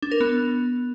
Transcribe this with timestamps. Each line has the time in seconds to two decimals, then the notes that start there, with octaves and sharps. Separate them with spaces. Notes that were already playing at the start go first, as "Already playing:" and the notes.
0.02 D4
0.11 A#4
0.21 B3